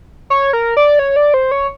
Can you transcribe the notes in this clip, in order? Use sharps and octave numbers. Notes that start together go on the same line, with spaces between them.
C#5
A#4
D5
C#5
D5
C5
C#5